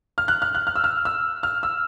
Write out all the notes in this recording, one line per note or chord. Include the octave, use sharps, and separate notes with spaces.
F6
F#6
F6
F#6
F6
E6
F6
E6
F6
E6